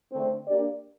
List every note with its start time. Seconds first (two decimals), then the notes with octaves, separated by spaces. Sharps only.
0.12 D3 A3 C4
0.47 A#3 D4 G4 D5